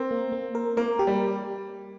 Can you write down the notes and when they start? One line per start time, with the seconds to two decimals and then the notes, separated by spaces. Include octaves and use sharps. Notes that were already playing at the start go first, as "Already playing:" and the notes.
Already playing: C4 A#4
0.11 A#3
0.32 A#3
0.55 A#4
0.77 A#3 A#4
0.99 G4
1.07 G3